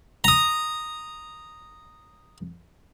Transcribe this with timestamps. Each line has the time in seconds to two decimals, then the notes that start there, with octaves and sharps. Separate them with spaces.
0.24 A#5 D#6